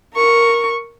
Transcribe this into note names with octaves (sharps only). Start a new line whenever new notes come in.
A#4 C#6